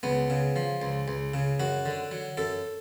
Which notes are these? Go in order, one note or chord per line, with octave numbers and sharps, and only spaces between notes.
C#2 B3
C#3
F3
C#2
C#2
C#3
F#2 F#4
D3
F#3
F#2 A4